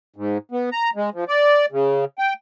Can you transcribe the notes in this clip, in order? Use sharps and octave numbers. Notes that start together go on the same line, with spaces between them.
G#2
B3
A#5
G#3
F3
D5
C#3
G5